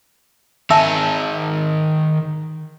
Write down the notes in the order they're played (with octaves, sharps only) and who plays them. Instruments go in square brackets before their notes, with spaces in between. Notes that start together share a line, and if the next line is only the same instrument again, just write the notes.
[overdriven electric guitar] D#3 G#4 [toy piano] E5 A5 E6